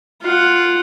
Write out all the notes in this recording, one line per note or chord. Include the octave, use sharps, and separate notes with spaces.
F4 F#5